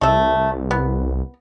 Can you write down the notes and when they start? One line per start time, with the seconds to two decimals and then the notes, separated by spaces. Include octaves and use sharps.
0.01 C2 A3 E5
0.71 B3